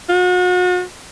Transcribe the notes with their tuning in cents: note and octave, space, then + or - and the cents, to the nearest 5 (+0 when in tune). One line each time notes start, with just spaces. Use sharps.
F#4 -40